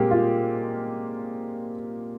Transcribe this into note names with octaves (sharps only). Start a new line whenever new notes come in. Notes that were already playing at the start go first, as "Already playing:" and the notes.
Already playing: A#2 G#3 A#3 C4 G4
F4